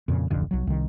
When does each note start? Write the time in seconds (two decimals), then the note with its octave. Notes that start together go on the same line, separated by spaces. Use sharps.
0.08 F2 A#2 C#3
0.30 D1 A1 F2 D3
0.51 B1 F#3
0.67 C2 D#3